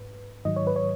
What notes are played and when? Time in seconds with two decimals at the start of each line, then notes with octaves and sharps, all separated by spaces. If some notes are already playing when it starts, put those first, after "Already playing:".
Already playing: G#2 B4
0.45 G#2 D#3 F#3 D#5
0.56 C#5
0.67 B4
0.76 C#5